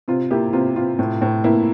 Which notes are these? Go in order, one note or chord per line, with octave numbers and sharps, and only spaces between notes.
C3 F4
A#3 E4 G4
C3 F4
C3 F4
A2
A2
A#3 E4